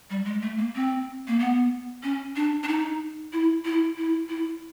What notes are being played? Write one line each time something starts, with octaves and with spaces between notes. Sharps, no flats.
G3
G#3
A3
A#3
C4
A#3
B3
C#4
D4
D4
D#4
E4
E4
E4
E4